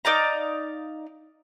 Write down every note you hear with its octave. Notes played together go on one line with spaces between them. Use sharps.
D#4 D5 F5 A#5